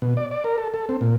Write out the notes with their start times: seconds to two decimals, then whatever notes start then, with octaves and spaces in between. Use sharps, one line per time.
0.02 B2
0.17 D5
0.31 D5
0.44 A#4
0.58 A4
0.74 A4
0.89 C4
1.01 A#2